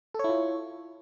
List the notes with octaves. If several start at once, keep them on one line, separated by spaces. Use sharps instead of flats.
E4 F4 A4 C#5